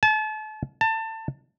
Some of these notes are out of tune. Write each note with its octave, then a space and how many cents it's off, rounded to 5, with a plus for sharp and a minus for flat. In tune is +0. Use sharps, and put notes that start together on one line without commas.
A5 -35
A5 +25